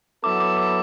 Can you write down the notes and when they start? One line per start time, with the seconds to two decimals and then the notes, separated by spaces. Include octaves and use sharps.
0.23 F#3 B3 E4 A4 D6
0.40 D6
0.58 D6